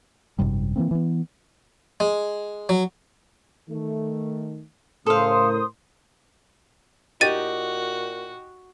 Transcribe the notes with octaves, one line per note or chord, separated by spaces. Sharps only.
G#1 F#2 C3 G3
E3 F3 A#3 C4
E3 B3
G#3
F#3
D#3 A3
A2 C#3 A4 A#4 C5 F5 C6 D#6
A#2 D#4 F#4 G4 A6 D#7